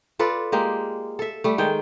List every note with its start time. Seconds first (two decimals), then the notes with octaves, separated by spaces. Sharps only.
0.19 F4 A4 B4 D5
0.52 G#3 A#3 G4
1.19 A4 E5
1.44 G3 A3
1.58 D#3 G#3 G5